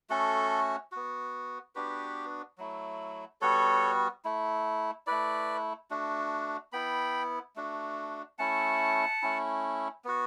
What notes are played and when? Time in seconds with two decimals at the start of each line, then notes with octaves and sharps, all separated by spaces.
0.10 A3 C#4 F#4 A4
0.92 B3 F#4
1.75 B3 D4 F#4 G4 B4
2.58 F#3 A3 E4
3.41 G3 B3 F#4 A4 C#5
4.25 A3 E4
5.07 A3 E4 B4 D5
5.90 A3 D4 F#4
6.72 B3 E4 G5 B5
7.56 A3 D4 F#4
8.38 A3 C#4 E4 F#5 A5
9.22 A3 C#4 E4
10.05 B3 F#4